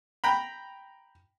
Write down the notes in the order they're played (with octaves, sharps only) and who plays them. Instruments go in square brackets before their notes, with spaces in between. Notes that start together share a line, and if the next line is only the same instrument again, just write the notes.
[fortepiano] G5 A#5 B5